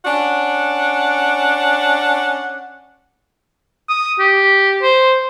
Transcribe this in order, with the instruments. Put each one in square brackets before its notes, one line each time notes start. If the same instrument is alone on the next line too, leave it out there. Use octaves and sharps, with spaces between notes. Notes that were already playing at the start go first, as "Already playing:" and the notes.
[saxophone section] C#4 D4 F#5
[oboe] D#6
G4
C5